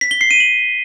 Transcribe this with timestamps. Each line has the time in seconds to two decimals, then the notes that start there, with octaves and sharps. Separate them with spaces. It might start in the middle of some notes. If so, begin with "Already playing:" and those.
0.01 B6
0.11 G7
0.21 C7
0.31 D#7
0.40 F#7